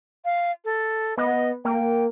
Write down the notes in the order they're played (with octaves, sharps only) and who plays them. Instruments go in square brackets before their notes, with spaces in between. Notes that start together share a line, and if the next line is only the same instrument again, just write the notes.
[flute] F5
A4
[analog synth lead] B3 [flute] D#5
[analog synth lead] A#3 [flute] G5